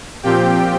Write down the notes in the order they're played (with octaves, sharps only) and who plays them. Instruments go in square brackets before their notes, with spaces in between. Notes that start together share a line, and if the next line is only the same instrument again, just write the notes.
[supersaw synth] A#2 F3 C4 F4 G4 G5